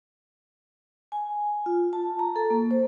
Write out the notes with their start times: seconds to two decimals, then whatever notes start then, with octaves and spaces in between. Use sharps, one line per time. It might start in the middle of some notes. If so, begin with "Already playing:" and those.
1.12 G#5
1.66 F4
1.93 A5
2.19 A#5
2.36 A4
2.50 A#3
2.71 C5